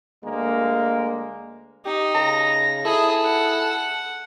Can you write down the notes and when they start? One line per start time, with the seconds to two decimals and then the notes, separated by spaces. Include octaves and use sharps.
0.23 D2 G#3 A#3
1.85 D#4 G4
2.15 C#3 A#5
2.85 E4 G#4 A4
3.25 F#5